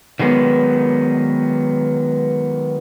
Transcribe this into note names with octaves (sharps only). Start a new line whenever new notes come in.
D#3 F#3 G#3 B3